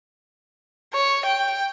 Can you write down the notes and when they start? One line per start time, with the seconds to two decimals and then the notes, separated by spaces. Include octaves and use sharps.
0.93 C#5
1.26 G5